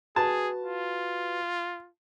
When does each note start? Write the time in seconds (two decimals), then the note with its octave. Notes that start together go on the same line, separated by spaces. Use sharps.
0.16 F#4 G#4 B4 A5
0.64 F4